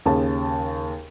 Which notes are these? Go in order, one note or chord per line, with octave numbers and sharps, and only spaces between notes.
D#2 C#3 G#4 A5